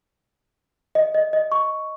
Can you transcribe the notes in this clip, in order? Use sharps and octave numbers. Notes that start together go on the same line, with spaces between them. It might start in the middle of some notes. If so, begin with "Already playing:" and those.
D#5
D#5
D#5
C#6